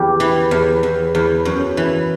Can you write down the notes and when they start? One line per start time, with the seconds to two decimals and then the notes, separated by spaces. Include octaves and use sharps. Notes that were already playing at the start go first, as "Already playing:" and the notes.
Already playing: E2 G4
0.20 E3
0.51 E2
0.83 E2
1.15 E2
1.45 F#2
1.77 E3